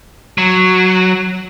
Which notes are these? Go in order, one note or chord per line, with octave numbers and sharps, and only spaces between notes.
F#3